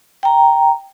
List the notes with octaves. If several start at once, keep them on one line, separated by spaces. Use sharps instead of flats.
G5 A#5